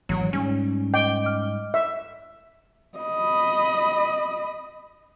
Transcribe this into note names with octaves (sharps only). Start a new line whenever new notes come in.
G#1 B2 E3 F#3
G#2 G3 C#4
D#5 G5 D6
D#5 D6 F6
E5
D#5 B5